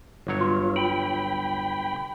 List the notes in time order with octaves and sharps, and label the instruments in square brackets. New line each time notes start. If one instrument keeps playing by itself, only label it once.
[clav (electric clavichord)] G1 F#3 C#5
[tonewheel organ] F4
G5 B5